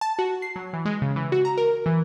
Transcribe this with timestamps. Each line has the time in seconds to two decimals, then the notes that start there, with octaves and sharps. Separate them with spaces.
0.01 A5
0.19 F#4
0.42 C7
0.56 F#3
0.73 E3
0.85 G#3
1.02 C#3
1.16 E3
1.32 F#4
1.45 A#5
1.57 A#4
1.86 E3